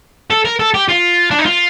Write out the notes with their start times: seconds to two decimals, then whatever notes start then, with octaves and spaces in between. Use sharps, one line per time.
0.31 A4
0.45 A#4
0.59 A4
0.74 G4
0.88 F4
1.31 D4
1.39 D#4
1.45 F4